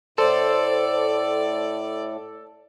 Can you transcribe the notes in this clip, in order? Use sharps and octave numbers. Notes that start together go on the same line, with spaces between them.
A2 A4 C5 D5